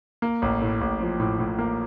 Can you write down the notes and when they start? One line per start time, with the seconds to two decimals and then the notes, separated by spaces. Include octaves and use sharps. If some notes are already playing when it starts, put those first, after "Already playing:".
0.22 A#3
0.42 A1
0.61 A2
0.81 A1
1.01 F3
1.20 A2
1.39 A2
1.59 A#3